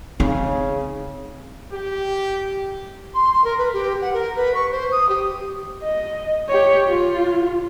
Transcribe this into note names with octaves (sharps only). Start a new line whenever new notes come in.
C#3 C4 D#4
G4
C6
C6
A#4
B4
G4
F#5
A#4
B4
C#6
C5
D#6
G4
D#5
G4 C#5
F4